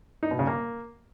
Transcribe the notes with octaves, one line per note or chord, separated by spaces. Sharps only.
D#4
B2
C#3
A#3